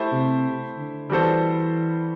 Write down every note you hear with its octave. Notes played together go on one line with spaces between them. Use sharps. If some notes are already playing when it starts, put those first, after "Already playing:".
Already playing: A3 E4 G4 C5
C3
D3
E3 G3 B3 F#4 A4 C5